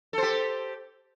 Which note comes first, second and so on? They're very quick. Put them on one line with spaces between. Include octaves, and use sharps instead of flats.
A4 C5 G4